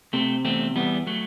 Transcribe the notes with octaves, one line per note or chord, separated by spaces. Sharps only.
C3 A3 C4
E2 A3 C4
E2 G3 B3
F#3 A3